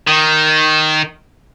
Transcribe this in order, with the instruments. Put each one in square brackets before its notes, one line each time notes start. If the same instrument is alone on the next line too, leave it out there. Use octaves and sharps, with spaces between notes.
[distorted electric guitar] D#3